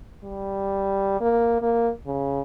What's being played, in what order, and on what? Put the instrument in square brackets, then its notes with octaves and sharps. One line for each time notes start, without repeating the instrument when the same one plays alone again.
[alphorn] G3
A#3
A#3
C#3